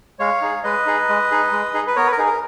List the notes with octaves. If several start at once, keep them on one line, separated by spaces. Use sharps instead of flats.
G#3 C#5 F5
D#4 G#4
G#3 B4 D#5
D#4 G#4
G#3
D#4 G#4
G#3
D#4 G#4
B4
B3 A#4 C#5
B4
A#4
D#4 G#4
A#4